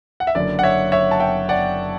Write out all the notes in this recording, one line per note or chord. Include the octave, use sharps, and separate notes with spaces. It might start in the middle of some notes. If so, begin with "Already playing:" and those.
F#5
E5
F#1 F#2 D3 D5
F#5
C#5 E5
C#5 E5
A5
E5 G5
D5 F#5